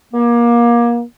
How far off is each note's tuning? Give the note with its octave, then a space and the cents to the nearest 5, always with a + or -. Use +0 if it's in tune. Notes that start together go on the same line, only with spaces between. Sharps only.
A#3 +25